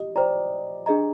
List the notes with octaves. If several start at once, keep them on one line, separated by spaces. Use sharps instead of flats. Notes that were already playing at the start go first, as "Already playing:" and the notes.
Already playing: G4 D#5
C5 D5 G5 A#5
D4 G#4 D#5 A#5